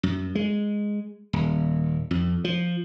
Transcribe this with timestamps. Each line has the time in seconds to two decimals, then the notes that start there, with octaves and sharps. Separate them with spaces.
0.03 F#2
0.35 G#3
1.33 D#1
2.11 F2
2.44 F3